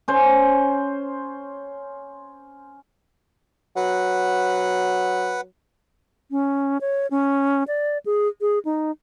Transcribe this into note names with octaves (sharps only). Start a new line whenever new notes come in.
C#4 C5
F#3 B4 F#5
C#4
C#5
C#4
D5
G#4
G#4
D#4